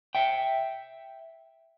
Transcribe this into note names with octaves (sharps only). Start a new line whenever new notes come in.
E5 G5